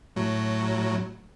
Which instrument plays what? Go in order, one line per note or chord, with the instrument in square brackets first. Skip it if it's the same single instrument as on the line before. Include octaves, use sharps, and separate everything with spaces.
[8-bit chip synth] A2 F#3